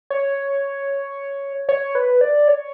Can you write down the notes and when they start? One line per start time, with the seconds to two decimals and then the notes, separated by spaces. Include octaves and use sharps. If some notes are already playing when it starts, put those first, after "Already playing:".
0.10 C#5
1.69 C#5
1.95 B4
2.21 D5
2.48 C#5